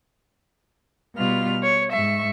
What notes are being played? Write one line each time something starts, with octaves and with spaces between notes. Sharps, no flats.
B2 G3 B3 F4 F6
C#5
G#2 E5 C#6